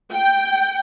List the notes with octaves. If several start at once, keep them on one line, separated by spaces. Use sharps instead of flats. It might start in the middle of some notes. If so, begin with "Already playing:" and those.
G5